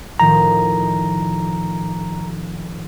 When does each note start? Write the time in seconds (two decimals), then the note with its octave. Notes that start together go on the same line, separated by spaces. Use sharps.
0.20 A2 D#3 F3 A#5